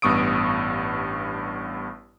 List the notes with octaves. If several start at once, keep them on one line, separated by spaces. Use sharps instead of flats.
A1 G2 B3 C#6 D#6 D7